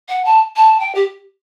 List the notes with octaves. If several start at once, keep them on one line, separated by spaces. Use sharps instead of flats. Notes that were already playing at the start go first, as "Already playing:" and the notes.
F#5
A5
A5
G5
G4